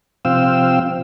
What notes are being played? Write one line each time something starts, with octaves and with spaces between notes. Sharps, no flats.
C3 F3 C4 F5 G5 E6